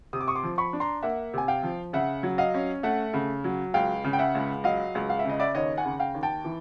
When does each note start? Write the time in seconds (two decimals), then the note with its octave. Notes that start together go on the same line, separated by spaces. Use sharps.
0.13 C3 D#6
0.21 D6
0.28 C#6 D#6
0.35 C6 D6
0.44 F3
0.58 B5 C#6
0.73 D4
0.80 A#5 C6
1.03 A#3 E5 F#5
1.34 C3 G#5
1.48 F5 G5
1.63 F3
1.93 C#3 E5 F#5
2.23 F#3
2.38 D#5 F5
2.54 C#4
2.83 A3 E5 F#5
3.14 C#3
3.44 F#3
3.74 C#2 F5 G5
4.04 C#3
4.13 G5
4.19 E5 F#5
4.35 C#2
4.64 F#3 D#5 F5
4.95 C#2
5.10 F5
5.19 E5
5.25 C#3 D#5
5.40 D5 E5
5.55 D#2 C#5 D#5
5.77 F#5 G#5
5.85 C#3
6.00 F5 G5
6.14 D#2
6.23 G5 A5
6.45 E3